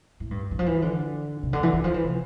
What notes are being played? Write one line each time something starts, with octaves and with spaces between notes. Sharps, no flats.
A2
G2
E3
F3
E3
D3
C3
D3
E3
E3
F3
E3
C3